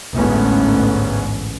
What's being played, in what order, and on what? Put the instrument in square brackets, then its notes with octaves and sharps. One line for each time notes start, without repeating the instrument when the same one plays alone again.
[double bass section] A1 D2 G#2 A3 B3 C#4